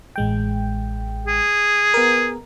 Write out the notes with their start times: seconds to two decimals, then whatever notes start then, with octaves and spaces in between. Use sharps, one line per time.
0.16 A1 G#3 G5
1.26 G#4
1.94 B3 A#4